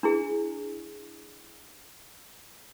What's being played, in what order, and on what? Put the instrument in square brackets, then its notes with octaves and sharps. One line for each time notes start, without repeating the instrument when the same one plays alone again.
[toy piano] D4 E4 G#4